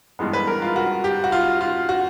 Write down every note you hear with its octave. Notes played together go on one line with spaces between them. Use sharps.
G2 E3 G#3 B3
B4
A#4
F4
F#4
G4
F#4
F4
F4
F#4